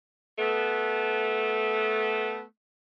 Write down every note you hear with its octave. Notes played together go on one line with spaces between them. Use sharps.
A3 B3